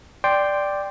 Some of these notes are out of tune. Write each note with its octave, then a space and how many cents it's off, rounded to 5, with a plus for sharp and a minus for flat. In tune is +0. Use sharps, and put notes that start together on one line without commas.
D5 +0 G5 +0 C6 +0